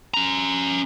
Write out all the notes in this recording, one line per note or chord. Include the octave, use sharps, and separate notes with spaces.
C#4 A#5